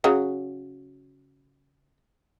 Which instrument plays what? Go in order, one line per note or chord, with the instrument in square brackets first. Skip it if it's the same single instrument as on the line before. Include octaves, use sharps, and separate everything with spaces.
[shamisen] C#3 F#3